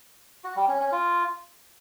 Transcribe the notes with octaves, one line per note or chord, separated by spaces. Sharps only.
F#4
G3
C#4
C#4
F4